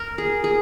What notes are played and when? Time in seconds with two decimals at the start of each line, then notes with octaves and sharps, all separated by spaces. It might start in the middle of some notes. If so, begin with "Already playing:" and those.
Already playing: A#4
0.18 G#4
0.44 G#4